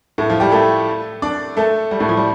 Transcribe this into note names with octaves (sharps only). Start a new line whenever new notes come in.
A2 A3
F3 F4
G3 G4
A3 A4
D4 D5
A3 A4
G3
A2 A3
F3
G3